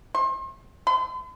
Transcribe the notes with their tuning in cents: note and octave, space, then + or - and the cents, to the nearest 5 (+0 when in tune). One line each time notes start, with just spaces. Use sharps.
C6 +35
C6 -45